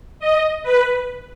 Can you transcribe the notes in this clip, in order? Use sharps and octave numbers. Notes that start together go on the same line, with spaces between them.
D#5
B4